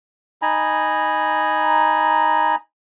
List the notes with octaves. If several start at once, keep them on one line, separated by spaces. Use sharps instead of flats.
D#4 G#5 A#5 B5